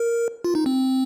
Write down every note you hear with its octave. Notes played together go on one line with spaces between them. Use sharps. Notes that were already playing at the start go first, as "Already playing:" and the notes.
Already playing: A#4
F4
D#4
C4